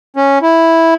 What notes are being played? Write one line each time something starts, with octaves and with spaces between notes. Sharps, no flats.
C#4
E4